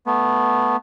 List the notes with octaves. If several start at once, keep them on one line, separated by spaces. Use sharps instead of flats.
A3 B3